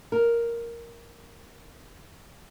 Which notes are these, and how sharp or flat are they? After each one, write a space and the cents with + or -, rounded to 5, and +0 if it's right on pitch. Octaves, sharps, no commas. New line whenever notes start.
A#4 +0